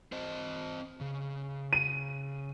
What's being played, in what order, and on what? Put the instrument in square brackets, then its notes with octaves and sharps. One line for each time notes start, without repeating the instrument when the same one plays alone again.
[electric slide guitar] C4 C5 D#5
C#3
[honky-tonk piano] D#7